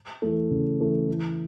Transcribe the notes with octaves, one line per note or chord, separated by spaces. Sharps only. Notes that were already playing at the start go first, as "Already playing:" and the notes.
E3 A3
C#3
E3 A3
E3